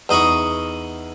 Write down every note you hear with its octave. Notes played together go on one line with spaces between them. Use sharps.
E2 D#4 D#5 B5 C#6